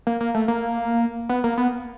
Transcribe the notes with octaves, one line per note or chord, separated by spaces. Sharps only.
A#3
A#3
A3
A#3
B3
A#3
B3